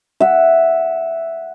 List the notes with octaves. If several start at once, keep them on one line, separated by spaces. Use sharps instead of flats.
E5 F#5